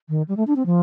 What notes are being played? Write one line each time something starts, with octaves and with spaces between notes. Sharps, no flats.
D#3
G3
A3
D4
C4
F3